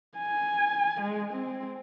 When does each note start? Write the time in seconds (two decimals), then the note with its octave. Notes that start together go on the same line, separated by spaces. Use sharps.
0.18 G#5
1.02 G#3
1.34 C4